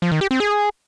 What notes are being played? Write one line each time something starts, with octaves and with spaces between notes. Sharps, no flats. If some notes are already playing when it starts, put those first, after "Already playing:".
F3
D#3
G4
C4
G#4